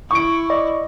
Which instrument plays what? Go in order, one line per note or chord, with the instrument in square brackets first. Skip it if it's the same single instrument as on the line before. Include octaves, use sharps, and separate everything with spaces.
[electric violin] E4 [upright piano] C#6 D7
[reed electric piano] D5 [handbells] D#5